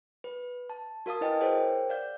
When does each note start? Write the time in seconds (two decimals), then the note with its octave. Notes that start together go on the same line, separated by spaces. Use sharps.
0.24 B4
0.70 A5
1.06 F#4 A#4 F5 A5 D#6
1.21 E4 B4 D#5 G5 G#5
1.41 G#4 A#4 C5 C#5 F#5 G5
1.89 D5 F5 G6